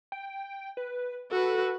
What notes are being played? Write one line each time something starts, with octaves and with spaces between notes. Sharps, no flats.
G5
B4
F#4 A4 B4